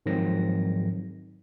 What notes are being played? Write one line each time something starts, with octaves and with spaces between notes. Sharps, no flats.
G#2 D#3 F3 F#3 C4 A#6